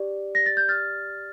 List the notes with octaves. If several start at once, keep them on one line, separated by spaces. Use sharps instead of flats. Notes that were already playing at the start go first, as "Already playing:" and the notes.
Already playing: G4 D5
A#6
A6
G6
F6 A6